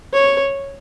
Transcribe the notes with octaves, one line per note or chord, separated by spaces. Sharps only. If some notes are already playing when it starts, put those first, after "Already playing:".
C#5